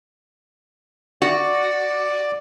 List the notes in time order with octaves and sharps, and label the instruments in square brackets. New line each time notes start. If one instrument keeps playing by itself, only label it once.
[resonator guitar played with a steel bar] F#4 [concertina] D5 D6